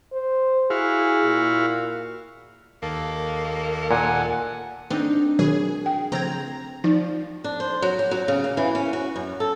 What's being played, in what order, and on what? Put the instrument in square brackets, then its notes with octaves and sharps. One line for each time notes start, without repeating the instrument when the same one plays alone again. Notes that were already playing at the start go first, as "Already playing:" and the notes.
[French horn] C5
[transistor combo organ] E4 F#4 F5 [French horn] G#4
[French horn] A#2
[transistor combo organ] D#2 A4 [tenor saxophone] A#3
[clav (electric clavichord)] A#2 [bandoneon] F#5 G#5
[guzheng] C4 D4 [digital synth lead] D#4
[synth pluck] B2 D#3 F#3 [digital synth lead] G#4
[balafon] G5
[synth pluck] C#3 F3 G#6 [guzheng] C4 [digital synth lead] A#5
[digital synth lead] F3 [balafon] D#4 [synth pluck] D5
[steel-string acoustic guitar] D4
C5
F#3
G4
F#3
C#3
A#3
E3
C#4
F#4
F#2
A4